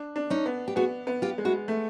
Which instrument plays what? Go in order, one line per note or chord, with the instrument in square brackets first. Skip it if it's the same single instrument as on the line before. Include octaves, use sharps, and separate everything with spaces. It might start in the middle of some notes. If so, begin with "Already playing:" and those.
Already playing: [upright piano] D4
D4
[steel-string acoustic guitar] C#4 D#4
[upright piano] B3
[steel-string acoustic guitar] G4
[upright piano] B3 [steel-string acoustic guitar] F#4 G#4
[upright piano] B3
[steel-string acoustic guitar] F4 G4
[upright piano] G#3
[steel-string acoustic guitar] E4 F#4
[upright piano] A3